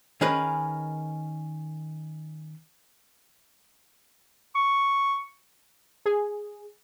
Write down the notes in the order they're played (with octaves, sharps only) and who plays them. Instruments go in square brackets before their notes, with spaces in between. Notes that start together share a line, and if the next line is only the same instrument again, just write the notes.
[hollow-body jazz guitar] D#3 C#4 G#4 A#4 B4
[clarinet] C#6
[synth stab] G#4